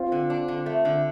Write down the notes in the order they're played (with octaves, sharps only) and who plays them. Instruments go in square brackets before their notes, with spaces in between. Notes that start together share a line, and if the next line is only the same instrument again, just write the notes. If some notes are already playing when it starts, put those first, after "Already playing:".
Already playing: [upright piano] C4 F4
[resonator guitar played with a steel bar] D3
D4
D3
A3
D3